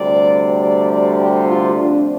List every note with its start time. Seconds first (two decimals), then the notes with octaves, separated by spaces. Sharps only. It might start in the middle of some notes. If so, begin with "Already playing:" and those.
Already playing: D2 C3 G3 D5
0.62 D5
0.90 D5
1.18 G4
1.48 F4
1.75 F2 F3 A3 D4